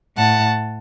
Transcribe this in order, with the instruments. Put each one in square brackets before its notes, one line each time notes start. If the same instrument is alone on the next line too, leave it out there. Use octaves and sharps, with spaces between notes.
[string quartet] A2 F#5 A5